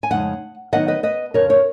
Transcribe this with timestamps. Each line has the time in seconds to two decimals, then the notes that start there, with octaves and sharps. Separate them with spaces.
0.03 G#5
0.11 F2 C#3 G#3 D#4 F#5
0.72 D#3 F#3 B3 D#4 D#5 F#5
0.88 B4 D#5
1.03 B4 D#5
1.34 F2 C#3 F3 A#4 C#5
1.50 A#4 C#5